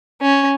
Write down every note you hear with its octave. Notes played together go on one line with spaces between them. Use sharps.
C#4